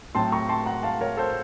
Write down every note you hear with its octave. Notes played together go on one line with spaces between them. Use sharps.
A2 F#3 C4 A5 C6
A#5 C#6
A5 C6
F#5 A#5
F5 A5
A#4 C#5
A4 C5